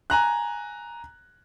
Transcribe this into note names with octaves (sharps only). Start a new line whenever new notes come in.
G#5 A#5 F#6